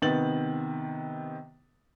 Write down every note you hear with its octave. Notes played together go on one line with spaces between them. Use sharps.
C3 D#3 B3 A6 F#7